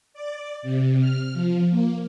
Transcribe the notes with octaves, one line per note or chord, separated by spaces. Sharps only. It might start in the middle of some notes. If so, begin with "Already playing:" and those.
D5
C3
F6
F3
A#3